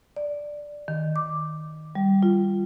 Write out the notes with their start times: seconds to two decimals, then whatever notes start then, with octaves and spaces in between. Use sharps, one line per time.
0.16 D5
0.88 D#3
1.16 D6
1.95 G3
2.23 F4